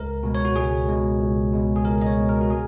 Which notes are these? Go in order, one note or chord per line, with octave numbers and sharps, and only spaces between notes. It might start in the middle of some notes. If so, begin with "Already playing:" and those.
Already playing: C#2 A#4
B2 G#3
C#5
F#4
C#2 G#4
B2 G#3
C#2
B2 G#3
G#4
C#2 A#4
D#5
C#5
B2 G#3
A#4
F#4
G#4